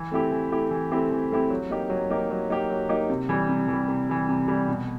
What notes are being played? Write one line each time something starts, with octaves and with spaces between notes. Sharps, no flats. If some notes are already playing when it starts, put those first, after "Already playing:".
Already playing: E3
A3 C4 E4 G4
E3
A3 C4 E4 G4
E3
A3 C4 E4 G4
E3
A3 C4 E4 G4
F#3
A#3 D#4 G4
F#3
A#3 D#4 G4
F#3
A#3 D#4 G4
F#3
A#3 D#4 G4
C3
E3 G3
C3
E3
G3
C3
E3 G3
C3
E3 G3
B2